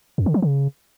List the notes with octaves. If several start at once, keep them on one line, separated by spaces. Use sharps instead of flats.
F2
D3
F3
C#3